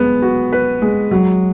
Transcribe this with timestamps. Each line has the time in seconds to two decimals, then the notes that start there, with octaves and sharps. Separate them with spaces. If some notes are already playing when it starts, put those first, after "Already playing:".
Already playing: G#3 B3
0.22 F#4
0.53 B4
0.82 G#3
1.11 F#3